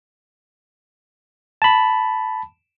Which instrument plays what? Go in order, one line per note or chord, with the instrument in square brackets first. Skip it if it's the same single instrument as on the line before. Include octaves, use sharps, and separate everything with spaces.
[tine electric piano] A5 B5